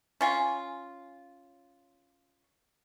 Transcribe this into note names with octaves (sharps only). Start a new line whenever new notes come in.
C#4 F4 G#5